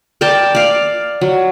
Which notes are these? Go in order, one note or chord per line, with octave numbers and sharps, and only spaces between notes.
A#4 D5 G5 A5
D5 F5
F#3